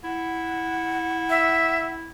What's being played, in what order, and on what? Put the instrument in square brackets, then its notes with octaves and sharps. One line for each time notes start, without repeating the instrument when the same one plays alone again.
[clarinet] E4 [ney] F#5
[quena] E5